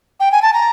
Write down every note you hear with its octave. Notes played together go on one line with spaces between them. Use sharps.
G5
G#5
A5
A#5